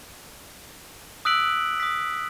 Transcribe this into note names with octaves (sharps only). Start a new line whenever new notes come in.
D#6 E6 F#6 B6 D7 F#7
D#6 B6